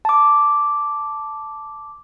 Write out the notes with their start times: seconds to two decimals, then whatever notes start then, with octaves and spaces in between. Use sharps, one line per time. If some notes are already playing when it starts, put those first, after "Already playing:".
0.05 A5 D6